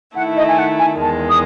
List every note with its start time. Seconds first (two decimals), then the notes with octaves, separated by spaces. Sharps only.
0.15 D#3 A3 E4 F#5
0.36 D#5
0.48 G#5
0.58 F#5
0.79 G#5
1.01 E2 D#3 G#3 A5
1.29 D#6